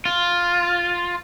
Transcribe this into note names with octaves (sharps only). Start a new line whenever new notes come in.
F4